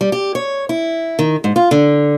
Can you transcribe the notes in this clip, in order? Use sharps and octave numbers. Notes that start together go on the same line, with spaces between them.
G3
G4
C#5
E4
D#3
G#2
F4
D3